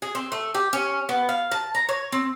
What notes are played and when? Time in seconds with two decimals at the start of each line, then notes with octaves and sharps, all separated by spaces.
0.02 G#4
0.15 C4
0.32 A3
0.54 G4
0.73 C#4
1.09 B3
1.29 F5
1.51 A5
1.75 A#5
1.89 C#5
2.12 C4